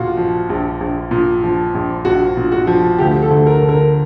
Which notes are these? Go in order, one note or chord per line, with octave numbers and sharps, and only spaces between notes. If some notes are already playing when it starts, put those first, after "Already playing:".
Already playing: A#1 A#2 F4 F#4
F3
A#1
A#1
A#2
F3
A#1
A#1 F#4
A#2
F#4
F3
D2 G4
A4
D2
A#4
D3
A#4